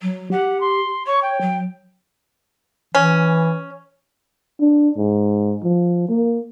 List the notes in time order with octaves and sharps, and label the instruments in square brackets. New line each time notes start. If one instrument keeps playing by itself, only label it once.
[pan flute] F#3
[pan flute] G4 [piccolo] F#5
[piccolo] C6
[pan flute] C#5 [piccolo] C#6
[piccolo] G5
[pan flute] F#3
[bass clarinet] E3 [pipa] C#4
[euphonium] D4
G#2
F3
A#3